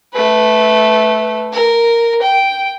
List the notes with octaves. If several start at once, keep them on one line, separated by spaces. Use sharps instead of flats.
A3 B4
A#4
G5